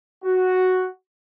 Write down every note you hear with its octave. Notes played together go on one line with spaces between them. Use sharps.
F#4